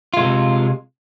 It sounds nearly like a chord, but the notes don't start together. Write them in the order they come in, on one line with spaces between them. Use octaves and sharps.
F4 G#3 C3